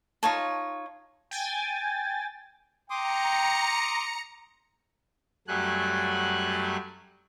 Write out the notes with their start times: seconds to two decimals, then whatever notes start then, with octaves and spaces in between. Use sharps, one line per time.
0.23 D#4 F4 C#5 A5
1.31 G5 G#5 A6
2.90 G5 A#5 C6 D6 D#6 C#7
5.48 F#2 F#3 G3 A3 G#5 F#6